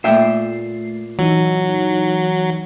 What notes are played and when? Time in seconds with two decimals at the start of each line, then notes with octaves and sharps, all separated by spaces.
0.04 A#2 A3 E5 G5 C7
1.19 E3 F#3 D#4